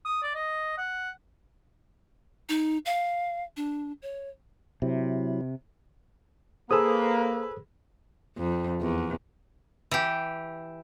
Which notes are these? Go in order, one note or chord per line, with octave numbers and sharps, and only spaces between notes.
D#6
D5
D#5
F#5
D#4
F5
D4
C#5
C3 F#3 E4
A#3 G#4 A4 B4 C5 D#6 E6
F2
E2
E3 G4